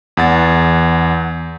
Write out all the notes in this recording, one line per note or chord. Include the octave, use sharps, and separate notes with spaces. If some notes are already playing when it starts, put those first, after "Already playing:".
E2 F#5 A6